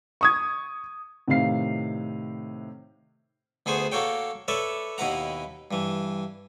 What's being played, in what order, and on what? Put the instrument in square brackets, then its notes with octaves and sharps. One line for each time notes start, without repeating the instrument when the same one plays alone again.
[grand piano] C#6 D#6 G#6
[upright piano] A2 C3 D#3 F5 C7
[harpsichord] D2 B3 G#4 C5 C#6
A#3 F#4 A4 C#5 G5
A4 B4 C#5 D5 E5
D#2 B2 E4 B4 F#5 A#5
G2 E3